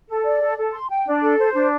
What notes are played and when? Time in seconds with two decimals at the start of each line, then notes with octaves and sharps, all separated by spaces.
0.08 A4
0.24 D5
0.41 A4
0.57 A4
0.73 C6
0.89 G5
1.06 D4
1.22 A4
1.38 C5
1.54 D4